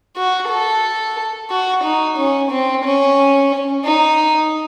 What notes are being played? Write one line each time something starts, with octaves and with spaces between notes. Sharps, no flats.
F#4
A4
F#4
D#4
C#4
C4
C#4
D#4